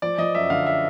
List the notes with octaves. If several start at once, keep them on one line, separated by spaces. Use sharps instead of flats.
F3 D5
F3 D#5
F#2 E5
D3 F5
E5